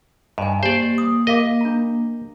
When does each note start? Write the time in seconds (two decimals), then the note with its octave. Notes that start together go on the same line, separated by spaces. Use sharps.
0.38 G2 D#5 G#5
0.63 A#3 G4 C5 D5
0.98 D#6
1.27 A#4 D#5 F5 D6
1.61 D4 A#5